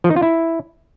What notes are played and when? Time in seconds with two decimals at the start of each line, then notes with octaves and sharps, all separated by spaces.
0.04 F3
0.10 D#4
0.16 F4
0.22 E4